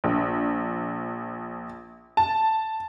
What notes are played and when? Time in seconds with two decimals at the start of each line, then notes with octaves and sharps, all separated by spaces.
0.04 A#1
2.17 A5